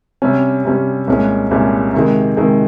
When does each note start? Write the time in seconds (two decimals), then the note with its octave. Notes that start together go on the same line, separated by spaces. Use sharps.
0.22 C3 G3 C#4
0.65 C3 G3 C#4
1.07 C2 A#2 G#3 C#4
1.51 C2 A#2 G#3 C#4
1.94 C3 D#3 G#3
2.37 C3 D#3 G#3